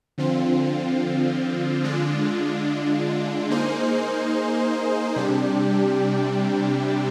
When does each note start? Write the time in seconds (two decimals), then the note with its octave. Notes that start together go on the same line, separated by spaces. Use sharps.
0.18 D3 F3 C4 F4
1.83 D3 G#3 D4 F4
3.50 A#3 D#4 G#4 C5
5.16 C3 G3 D4 G4